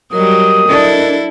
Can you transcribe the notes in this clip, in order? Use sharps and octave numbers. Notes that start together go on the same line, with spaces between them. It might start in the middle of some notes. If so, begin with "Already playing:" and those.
F#3 G3 A#4 D#5 D#6
D4 E4 A4